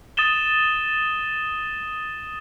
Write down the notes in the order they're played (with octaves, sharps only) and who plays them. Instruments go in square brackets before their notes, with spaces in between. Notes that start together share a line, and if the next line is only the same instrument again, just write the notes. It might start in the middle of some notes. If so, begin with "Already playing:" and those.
[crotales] D#6 A6 D#7 E7 G7